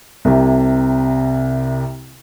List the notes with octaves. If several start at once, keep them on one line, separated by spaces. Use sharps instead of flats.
C2 C3